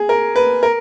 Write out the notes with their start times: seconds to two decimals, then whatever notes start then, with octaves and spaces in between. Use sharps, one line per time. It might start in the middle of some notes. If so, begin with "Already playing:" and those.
Already playing: G#4
0.09 A#4
0.36 B4
0.63 A#4